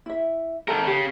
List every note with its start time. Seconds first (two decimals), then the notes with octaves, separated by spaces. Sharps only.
0.06 E4 E5
0.68 G#2 A4 A#4 A5
0.87 C#3 G4